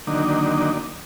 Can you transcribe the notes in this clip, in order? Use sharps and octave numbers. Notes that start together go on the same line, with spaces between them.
D3 D#3 F#3 A#3 D4 D#4